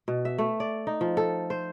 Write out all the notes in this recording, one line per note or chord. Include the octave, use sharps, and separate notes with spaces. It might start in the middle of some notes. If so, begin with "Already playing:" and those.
B2
E5
A3
D5
D#4
F3
A4
C5